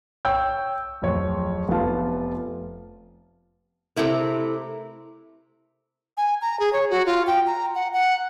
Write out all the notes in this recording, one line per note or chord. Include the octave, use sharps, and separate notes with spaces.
C#5 G5 E6 G6
D1 F2 C#5
F1 B3 F4 A5
C3 A3 E4 A#4
G#5
A#5
G#4
C#5
F#4
F4
G5
A#5
F#5
F#5